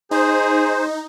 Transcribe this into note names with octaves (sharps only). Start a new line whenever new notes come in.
D#4 G#4 C5